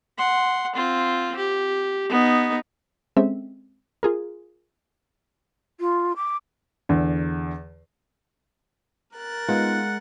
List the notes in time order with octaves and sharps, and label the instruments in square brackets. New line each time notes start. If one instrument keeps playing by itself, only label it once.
[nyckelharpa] F#5 C6
C4 F4
G4
B3 D#4
[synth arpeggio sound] G#3 C4 C#4 A4 E5
F4 G#4 A#4
[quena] F4
D6
[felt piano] E2 D3
[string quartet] A#4 F#6 A6
[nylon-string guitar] G#3 [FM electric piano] B3 D#4 F4 [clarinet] F#5